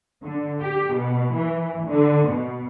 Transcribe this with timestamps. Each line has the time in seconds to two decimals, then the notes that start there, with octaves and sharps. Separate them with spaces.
0.24 D3
0.60 G4
0.94 B2
1.34 E3
1.87 D3
2.28 B2